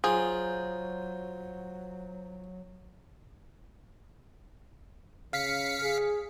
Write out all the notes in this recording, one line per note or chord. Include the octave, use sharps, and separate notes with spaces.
F#3 F4 G#4 C5 G#5 A#5 D#6
C#3 F5 B6 C#7
G#4